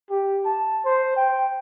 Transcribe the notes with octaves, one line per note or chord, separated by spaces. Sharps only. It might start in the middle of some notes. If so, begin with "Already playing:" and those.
G4
A5
C5
G5